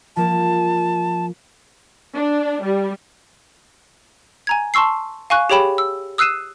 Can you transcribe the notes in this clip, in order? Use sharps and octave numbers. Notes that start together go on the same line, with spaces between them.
F3 A#3 A5
D4
G3
G#5 A#5 G#6
A5 C6 C#6 E6 C7
F5 G#5 C#6 F#6
G4 G#4 C#5 G5 B5 E7
E6
D#6 E6 F#6 C7 D#7 E7